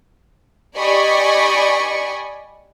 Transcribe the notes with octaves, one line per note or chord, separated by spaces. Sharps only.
G4 D5 D#5 G#5 B5 C#6